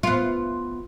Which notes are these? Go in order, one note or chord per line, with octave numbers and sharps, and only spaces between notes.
B3 F4